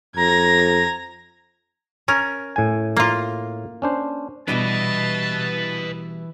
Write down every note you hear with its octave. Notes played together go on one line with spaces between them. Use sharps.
F2 A#5 G#6 A#6
C#4 A#4
A2 G#5
A#3 F4
C#4 D4 C5
B2 E3 G3 D4 E4 B4 D#5 A5